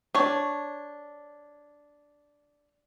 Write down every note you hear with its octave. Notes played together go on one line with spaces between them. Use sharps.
D4 C#5